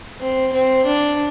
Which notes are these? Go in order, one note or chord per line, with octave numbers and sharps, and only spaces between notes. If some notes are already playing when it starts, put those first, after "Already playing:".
C4
C4
D4